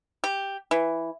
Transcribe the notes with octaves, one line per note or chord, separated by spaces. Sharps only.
G4
E3